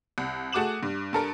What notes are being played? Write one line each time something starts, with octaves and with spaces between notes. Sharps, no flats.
C2
A3 F#4 G#4 D6 E7 F#7
G2
G2 A4 A#4